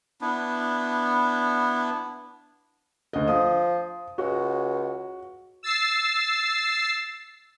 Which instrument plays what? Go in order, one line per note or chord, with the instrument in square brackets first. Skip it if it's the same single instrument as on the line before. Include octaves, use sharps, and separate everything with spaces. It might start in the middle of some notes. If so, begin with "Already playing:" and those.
[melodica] B3 D4 E4
[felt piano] D2 D#5
[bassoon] F3 [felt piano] D#6
[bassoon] C#2 [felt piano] F#4
[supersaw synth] E6 A6 C7